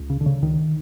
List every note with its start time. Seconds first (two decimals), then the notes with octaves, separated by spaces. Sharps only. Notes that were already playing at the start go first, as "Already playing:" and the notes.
Already playing: C#2
0.10 C#3
0.21 D3
0.26 C#3
0.42 C#2 D#3